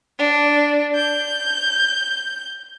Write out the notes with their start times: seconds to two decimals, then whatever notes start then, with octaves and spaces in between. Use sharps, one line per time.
0.19 D4
0.95 G6